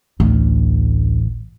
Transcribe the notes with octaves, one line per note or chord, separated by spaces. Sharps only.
A1 D2